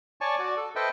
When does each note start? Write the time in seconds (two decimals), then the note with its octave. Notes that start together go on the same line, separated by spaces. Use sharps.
0.21 C#5 D5 G#5 A5 C#6
0.39 F#4 D5
0.57 A4
0.76 A4 B4 C5 D#5 E5 G5